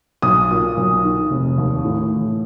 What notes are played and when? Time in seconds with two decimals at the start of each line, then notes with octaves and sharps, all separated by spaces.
0.22 B1 D#6
0.51 A#2
0.77 B1
1.04 D#3
1.30 F1
1.58 D#2
1.85 A2
2.11 E3